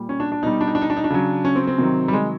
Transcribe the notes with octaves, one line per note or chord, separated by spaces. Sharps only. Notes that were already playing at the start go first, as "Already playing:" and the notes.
Already playing: A#2 G3
C#4
D4
D4
B2 G3 D#4
D4
D#4
D4
D#4
D4
D#4
D4
C#3 F#3
C#4
C4
C4
C3 D#3 F#3
G3
G#3